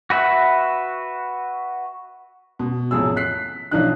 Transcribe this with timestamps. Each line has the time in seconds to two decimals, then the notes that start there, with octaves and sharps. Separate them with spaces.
0.10 F#4 B4 E5 F#5
2.59 B2
2.91 A1 F2 C3 G#4 E6
3.16 F#6 B6 C7
3.71 B1 E3 F3 D4 D#4 F#6